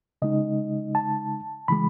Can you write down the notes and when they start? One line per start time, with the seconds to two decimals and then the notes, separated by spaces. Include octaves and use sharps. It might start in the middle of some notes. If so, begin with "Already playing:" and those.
0.22 C#3 G#3 D#4 D#5
0.95 A5
1.68 C#3 E3 G#3 B5